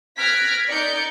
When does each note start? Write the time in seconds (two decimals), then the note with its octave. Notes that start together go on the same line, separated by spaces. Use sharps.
0.17 F6 F#6 G#6 A#6 B6 D7
0.70 D#4 D5 G6 C#7